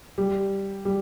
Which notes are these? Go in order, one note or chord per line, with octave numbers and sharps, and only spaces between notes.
G3
G3